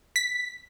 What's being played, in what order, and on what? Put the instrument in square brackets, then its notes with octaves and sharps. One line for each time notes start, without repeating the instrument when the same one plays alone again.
[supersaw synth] B6